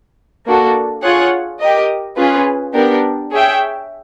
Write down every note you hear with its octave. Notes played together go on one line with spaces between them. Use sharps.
A#3 D4 F#4 A4
F4 G#4 C#5 F#5
G4 A#4 D#5
C#4 F4 G#4 B4
B3 D4 G4 A#4
G#4 C#5 E5 G5